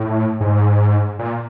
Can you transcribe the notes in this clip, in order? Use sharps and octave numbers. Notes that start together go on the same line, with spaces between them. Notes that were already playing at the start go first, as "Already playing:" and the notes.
Already playing: A2
G#2
A#2